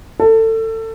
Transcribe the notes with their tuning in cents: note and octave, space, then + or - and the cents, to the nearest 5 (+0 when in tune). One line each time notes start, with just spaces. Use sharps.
A4 +25